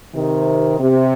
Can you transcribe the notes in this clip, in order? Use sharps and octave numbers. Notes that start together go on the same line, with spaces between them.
C3 D#3
C3